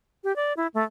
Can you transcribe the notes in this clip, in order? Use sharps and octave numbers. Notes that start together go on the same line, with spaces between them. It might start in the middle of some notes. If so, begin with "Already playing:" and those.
G4
D5
E4
A3